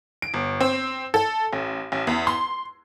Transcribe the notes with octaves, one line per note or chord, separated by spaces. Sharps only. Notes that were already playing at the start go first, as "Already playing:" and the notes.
D7
G1
C4
A4
A1
A1
E2
C6